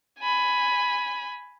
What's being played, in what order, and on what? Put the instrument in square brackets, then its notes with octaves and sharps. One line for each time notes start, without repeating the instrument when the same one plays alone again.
[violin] G#5 B5